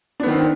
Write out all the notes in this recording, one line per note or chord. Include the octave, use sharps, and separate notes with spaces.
D#3 B3 C4 D4